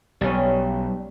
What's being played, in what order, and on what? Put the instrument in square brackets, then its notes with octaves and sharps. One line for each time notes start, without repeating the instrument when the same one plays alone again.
[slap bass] B1 [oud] G3 C#4